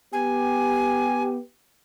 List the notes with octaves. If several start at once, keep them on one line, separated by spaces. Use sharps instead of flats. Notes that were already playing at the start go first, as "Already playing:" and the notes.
B3 G4 G#5